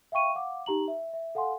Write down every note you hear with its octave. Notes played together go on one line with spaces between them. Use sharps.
E5 F5 G5 C#6 D#7
F5 F#5 D6
D#4 G4 A#5 F#7
E5
E5
A4 F5 F#5 G#5 C6